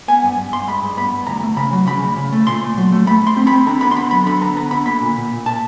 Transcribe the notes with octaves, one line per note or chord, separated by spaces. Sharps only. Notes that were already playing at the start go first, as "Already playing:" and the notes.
B3 G#5
G2
G2
G2 C6
G#3 B5
G2
B3 B5
G2
D2 A#5
A3
C#3 B5
F#3
C#3 B5
D2
C#3
A3
A#2 C6
A3
F#3
A3
A3 B5
A3 C6
C4
B5
C4
D3 A#5
B3 B5
C6
D3 B5
F#3 B5
D3 B5
B3 A#5
B3 A#5
D3 B5
A#3 B5
A#2
A#2
A#2
A#2 A5